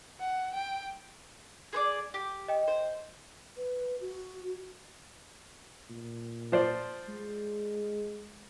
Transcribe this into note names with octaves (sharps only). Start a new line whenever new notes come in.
F#5
G5
G#4 C5 D5
G4
D#5 G5
C5
B4
F#4
A#2
F3 C5 D5
G#3